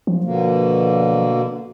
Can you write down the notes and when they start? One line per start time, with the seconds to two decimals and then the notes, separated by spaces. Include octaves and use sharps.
0.07 F3
0.24 B2 D3 A#3